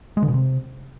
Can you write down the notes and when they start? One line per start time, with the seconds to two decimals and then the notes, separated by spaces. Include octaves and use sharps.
0.17 G#3
0.23 D3
0.28 B2
0.34 C3